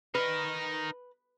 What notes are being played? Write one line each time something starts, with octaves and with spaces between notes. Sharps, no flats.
D#4 A#4 B4